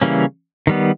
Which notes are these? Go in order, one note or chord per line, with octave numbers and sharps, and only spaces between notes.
C#3 E3 G3 A#3 C#4
D#3 G3 B3